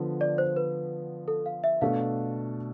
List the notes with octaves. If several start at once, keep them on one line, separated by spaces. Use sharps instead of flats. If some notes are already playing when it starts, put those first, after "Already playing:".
Already playing: D3 F3 B3
D5
C5
B4
A4
F5
E5
B2 A3 D4 A4 F5